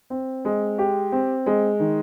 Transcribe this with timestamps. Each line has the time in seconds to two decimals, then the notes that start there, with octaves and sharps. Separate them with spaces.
0.10 C4
0.45 G#3
0.78 G4
1.12 C4
1.46 G#3
1.80 D#3